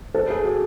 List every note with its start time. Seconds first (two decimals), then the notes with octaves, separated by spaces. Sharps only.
0.14 A4
0.30 G#4
0.45 F#4